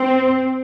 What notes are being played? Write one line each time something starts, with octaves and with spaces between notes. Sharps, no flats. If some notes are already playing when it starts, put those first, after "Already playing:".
Already playing: C4